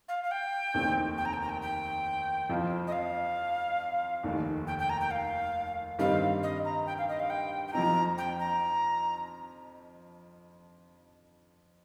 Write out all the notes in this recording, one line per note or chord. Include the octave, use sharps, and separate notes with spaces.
F5
F5
G5
F1 D#2 D#3 C4
G5
A#5
G5
A#5
G5
G5
F2 F3 C4 F4
D#5
F5
F1 D#2 D#3
G5
G5
A#5
G5
F5
G2 D#3 G3 C4 D#4 F5
D#5
A#5
G5
F5
D#5
F5
G5
G5
F2 F3 C4 D#4 A#5
G5
A#5